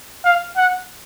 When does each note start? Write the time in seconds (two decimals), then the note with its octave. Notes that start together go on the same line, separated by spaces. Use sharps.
0.25 F5
0.57 F#5